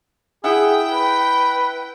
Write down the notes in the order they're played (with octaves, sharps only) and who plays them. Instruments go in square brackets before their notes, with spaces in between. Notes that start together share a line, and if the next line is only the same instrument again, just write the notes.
[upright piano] E4 F#5 E6 [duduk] G#4 [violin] G5
[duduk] B4